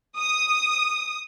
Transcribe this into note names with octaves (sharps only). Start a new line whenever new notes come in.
D#6